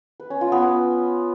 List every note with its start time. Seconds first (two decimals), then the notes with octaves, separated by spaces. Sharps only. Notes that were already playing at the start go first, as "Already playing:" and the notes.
0.20 B4
0.30 C#4
0.41 F4
0.52 B3
0.63 B4